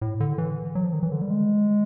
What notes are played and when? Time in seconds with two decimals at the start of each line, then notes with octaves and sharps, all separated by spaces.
0.01 A2
0.20 D3
0.38 E3
0.75 F#3
0.84 F3
0.93 D#3
1.03 E3
1.12 D3
1.21 G3
1.30 G#3